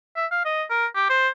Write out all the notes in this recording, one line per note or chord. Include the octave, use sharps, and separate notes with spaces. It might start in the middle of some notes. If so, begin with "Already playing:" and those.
E5
F5
D#5
A#4
G4
C5